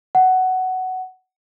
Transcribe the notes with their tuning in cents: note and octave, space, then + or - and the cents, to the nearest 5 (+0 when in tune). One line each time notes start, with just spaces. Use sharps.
F#5 +10